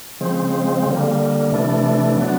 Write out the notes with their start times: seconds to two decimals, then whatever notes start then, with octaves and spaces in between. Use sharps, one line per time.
0.21 C#3 F3 G#3 C4
0.86 D3 G3 A#3
1.52 C3 E3 A3 D4
2.17 F#3 B3 D4